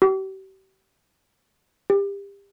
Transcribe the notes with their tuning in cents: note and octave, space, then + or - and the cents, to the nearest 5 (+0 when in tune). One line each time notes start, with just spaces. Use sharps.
G4 -40
G4 +30